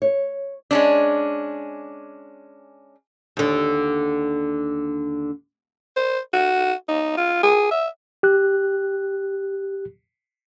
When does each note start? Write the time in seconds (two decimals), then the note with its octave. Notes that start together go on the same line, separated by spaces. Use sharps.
0.02 C#5
0.71 G#3 C#4 D4
3.37 D#2 D3
5.96 C5
6.34 F#4
6.89 D#4
7.17 F4
7.43 G#4
7.71 E5
8.23 G4 F#6